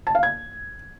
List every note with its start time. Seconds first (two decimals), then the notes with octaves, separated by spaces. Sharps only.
0.07 A5
0.15 F5
0.23 G#6